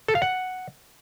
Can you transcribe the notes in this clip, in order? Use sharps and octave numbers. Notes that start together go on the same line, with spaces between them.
A4
F5
F#5